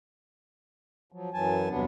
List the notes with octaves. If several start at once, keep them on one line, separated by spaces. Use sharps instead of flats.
F3 F#3
F#2 E3 F#3 G#5 A5
E2 G2 C3 F#3 B3 D4